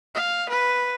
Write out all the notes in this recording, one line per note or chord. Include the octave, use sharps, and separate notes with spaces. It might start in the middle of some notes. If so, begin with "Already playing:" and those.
F5
B4